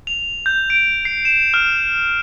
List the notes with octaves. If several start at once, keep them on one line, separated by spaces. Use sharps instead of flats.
F7
G6
D7
C7
E7
F6